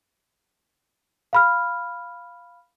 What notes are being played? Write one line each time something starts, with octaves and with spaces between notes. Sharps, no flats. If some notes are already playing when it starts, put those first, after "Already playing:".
F5 B5 F6